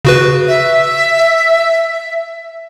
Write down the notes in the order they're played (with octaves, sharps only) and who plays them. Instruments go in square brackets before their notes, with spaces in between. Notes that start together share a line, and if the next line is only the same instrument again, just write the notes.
[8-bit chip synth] C#3 F#4 B4
[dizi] E5